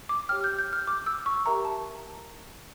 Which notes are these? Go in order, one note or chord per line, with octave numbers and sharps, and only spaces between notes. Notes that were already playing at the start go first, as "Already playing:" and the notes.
D6
G4 C#5 G5 F6
G6
G6
F6
D6
E6
C#6
G4 A#4 E5 G5 A#5
A5